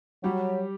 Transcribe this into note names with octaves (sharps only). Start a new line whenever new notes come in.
F#3 G3 G4